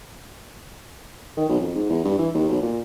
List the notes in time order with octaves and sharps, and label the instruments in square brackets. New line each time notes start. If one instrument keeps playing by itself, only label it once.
[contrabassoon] D#3
B1
F2
G#2
E2
G2
E3
D#2
B1
A#2